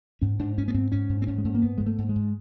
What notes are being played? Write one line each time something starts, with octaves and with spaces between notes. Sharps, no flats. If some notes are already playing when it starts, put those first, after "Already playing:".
G#2 C#4
G#2 D4
G#2 C#4
B3
G#2 C4
G#2 C#4
G#2
C4
G#2 C#4
G#3
G#2 A3
A#3
G#2 B3
G#2 G#3
A3
G#2
G#3
G#2